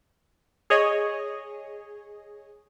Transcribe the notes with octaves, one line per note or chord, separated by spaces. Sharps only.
G#4 C#5 D#5